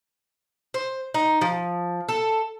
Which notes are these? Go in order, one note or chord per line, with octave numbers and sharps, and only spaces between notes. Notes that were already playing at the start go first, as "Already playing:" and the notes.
C5
D#4
F3
A4